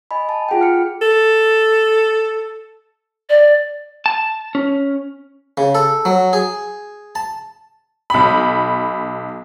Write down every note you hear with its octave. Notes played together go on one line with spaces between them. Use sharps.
D#5 G#5 B5
A5
F4 G#4 F#5 G5
F6 C#7
A4
D5
A5
C#4
C#3
A4
F#3
G#4
A5
B1 B5